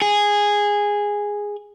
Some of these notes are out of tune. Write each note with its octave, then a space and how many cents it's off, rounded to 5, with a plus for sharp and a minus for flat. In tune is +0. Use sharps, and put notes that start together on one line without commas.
G#4 -10